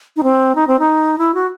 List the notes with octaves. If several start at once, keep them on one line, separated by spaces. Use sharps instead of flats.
D#4
C4
D#4
C4
D#4
E4
F#4